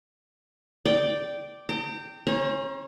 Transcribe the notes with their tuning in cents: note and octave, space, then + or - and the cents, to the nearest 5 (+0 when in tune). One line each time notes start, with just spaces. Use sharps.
D5 +0 G5 -10 D6 +0
G5 -5 A#5 -45
C#4 -20 C5 +30 A#5 +35